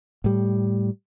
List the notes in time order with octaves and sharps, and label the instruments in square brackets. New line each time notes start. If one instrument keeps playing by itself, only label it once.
[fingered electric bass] A2 G3